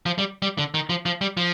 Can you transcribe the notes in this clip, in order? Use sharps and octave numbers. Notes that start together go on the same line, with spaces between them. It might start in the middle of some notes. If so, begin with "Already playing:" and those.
F3
G3
G3
D3
D#3
F3
F3
G3
F3